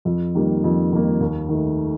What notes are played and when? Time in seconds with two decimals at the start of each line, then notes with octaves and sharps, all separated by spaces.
0.05 F2
0.35 D#3 G3 A#3
0.64 F2
0.92 D#3 G3 A#3
1.21 D#2
1.49 D#3 A3